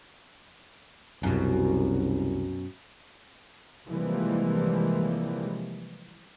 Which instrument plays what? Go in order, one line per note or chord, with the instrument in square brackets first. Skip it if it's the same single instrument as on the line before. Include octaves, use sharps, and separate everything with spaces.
[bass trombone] C2 [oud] F#2 B2
[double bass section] C3 E3 F3 G3 G#3 A#3